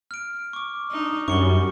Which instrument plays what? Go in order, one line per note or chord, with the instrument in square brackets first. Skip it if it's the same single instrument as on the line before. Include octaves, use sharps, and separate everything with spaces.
[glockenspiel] F6 D7
C#6 D6
[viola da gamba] D4 D#4
[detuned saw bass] F#2 [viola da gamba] G3 [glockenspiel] C#6 C#7 G7